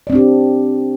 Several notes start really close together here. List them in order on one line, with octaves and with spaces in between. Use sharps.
D5 C4 D4 G4